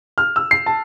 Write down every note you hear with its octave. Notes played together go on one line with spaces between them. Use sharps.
F6
E6
C7
A5